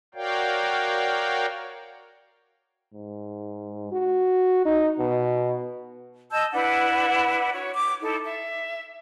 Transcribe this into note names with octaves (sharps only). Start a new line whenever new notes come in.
F#4 A#4 C#5 D5 F5 G5
G#2
F#4
D#4
B2
D#5 A5 E6 G6
D4 E4 B4 F#5
F#4 C#5
D6
D#4 E4 A4
E5